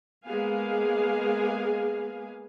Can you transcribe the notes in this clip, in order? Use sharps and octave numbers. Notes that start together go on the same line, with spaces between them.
G#3 A#3 B3 G#4 F5 G#5